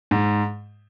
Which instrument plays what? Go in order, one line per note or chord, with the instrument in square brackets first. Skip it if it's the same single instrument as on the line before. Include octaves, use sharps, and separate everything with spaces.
[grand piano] G#2